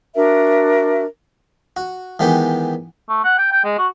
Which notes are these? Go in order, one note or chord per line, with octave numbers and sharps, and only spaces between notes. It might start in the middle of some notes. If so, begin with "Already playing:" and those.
D4 F#4 A#4 E5
F#4
D#3 E3 G#3 B3 G4
A3
F#5
G5
G5
G#3
F#4